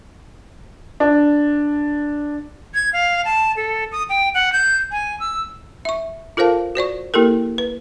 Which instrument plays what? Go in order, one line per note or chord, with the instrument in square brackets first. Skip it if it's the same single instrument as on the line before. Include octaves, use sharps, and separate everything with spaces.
[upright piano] D4
[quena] G#6
F5
A5
A4
D#6
G5
F#5
G6
G#5
E6
[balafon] E5 C#6
F4 A4 A#4 C5 F5 A5
F#4 C5 D5 C#6
A#3 E4 G4 A4 A#4
B4